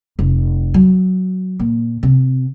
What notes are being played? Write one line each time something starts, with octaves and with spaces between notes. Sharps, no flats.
F1
F#3
A#2
C3